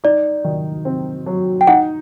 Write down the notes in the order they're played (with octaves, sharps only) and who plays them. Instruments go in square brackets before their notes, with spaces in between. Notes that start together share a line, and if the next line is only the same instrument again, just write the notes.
[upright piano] D#4 [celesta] D5
[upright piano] D#3
C4
F#3
[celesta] G5
[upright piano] D#4 [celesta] F#5